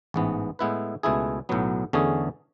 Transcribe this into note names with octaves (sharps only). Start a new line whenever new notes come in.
A1 G#2 E3 B3
A2 G#3 B3 E4 B4
C#2 B2 A3 E4 G#4
B1 A2 F#3 B3
E2 D3 A3 C#4 G#4